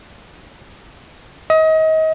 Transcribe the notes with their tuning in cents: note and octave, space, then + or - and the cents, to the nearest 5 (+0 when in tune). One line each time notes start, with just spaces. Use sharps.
D#5 +30